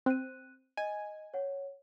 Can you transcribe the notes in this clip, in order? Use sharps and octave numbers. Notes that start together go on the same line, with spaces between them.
C4 F#6 D#7
D#5 G#5
C#5 F#5